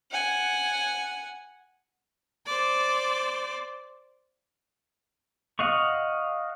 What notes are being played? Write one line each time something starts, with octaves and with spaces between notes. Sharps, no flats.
F#5 G#5
C5 D5
D#5 F5 F#5 C#6